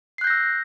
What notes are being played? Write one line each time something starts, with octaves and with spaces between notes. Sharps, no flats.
E6 F#6 G6 A#6 C7